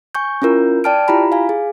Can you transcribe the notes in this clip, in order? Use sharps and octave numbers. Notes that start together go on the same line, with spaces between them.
G#5 C#6 G6
C#4 E4 F4 A#4 G6
D5 G5 A5 F6 D7
E4 F4 G4 A#5 B5
F5 G#5
G#4